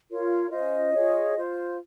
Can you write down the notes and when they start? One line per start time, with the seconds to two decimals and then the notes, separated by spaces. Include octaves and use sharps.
0.11 F4 A#4 C#5
0.52 C#4 F4 C5 D#5
0.93 F4 G#4 C#5
1.35 F4 C5